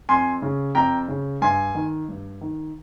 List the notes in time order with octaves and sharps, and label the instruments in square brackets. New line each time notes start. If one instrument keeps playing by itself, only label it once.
[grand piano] F2 G#5 C6
C#3
F2 G5 A#5
C#3
G2 G#5 C6
D#3
G2
D#3